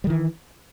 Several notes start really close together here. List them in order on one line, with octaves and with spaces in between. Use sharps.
G3 D#3 E3